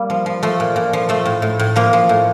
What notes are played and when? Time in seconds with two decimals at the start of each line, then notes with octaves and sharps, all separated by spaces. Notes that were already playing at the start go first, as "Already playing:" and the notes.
Already playing: G3 A#3
0.10 F3
0.26 F3
0.43 F3 A3
0.60 A#2
0.76 A#2
0.93 F3
1.09 F3 A3
1.25 A2
1.42 A2
1.59 A2
1.76 F3 A#3
1.93 F3
2.09 A2